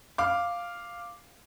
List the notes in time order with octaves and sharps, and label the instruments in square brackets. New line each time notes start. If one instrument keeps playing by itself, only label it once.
[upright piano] F5 D6